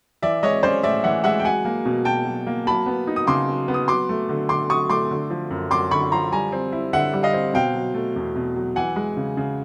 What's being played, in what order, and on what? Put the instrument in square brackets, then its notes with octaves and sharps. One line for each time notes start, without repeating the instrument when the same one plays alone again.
[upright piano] E3 D5 E5
G#3 C#5 D#5
C#4 C5 D5
A2 D5 E5
E3 E5 F#5
G#3 E5 F#5
G5
F#3 F#5 G#5
A#3
B2
B2 G5 A5
F#3
A#3
F#3 A5 B5
B3
D#4
D#6
C#3 C6 D6
F#3
B3
D#6
F#3 C6 D6
A3
D3
D3 C6 D6
F#3 C#6 D#6
A3 C6 D6
D3
F3
F#2
F#2 C6 D6
D3 B5 C#6
F3 A#5 C6
G3 G#5 A#5
C4
E4
D3 E5 F#5
G3
D#5 F5
C4
B2 F5 G5
F#3
A3
E2
B2
F#3
E3 F#5 G#5
G#3
C#3
C#3